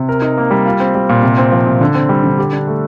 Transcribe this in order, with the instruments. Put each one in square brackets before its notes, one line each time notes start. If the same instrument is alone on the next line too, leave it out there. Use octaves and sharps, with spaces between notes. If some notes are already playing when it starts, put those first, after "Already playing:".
Already playing: [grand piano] C3
A#4
D#4
A#3
G3
F4
C4
G3
A#2
C3
C4
F3
C3
D3
C4
G3
D3
G4
D4
A3